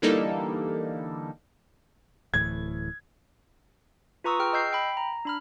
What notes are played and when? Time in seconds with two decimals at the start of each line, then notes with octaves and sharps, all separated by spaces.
0.02 D3 E3 G3 A#3 D#4 A4
2.34 D1 A2 E3 G#6
4.24 F4 B4 A#5 C#6 D#6 E6
4.39 G#4 G5 F6
4.53 D#5 E6 G6 C7
4.73 G5 B5
4.97 A#5
5.25 D4 B5 F6